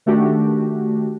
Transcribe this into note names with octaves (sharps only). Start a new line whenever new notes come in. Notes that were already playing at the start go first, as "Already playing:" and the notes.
D#3 A3 D4 F#4 G4